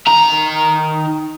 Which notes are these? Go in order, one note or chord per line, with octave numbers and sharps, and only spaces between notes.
D#3 A#5